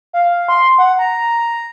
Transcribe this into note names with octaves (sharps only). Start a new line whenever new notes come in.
F5
C6
F#5
A#5